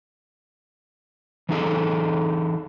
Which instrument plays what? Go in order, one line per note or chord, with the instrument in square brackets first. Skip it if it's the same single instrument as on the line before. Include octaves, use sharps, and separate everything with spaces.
[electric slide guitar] E3 D#4 G#4 A4